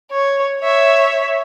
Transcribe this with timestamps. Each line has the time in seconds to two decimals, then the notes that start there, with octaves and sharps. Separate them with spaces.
0.11 C#5
0.60 C#5 E5